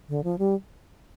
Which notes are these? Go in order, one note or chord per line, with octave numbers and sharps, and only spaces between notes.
D3
F3
G3